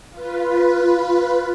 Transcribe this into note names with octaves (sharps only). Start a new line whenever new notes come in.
F4 B4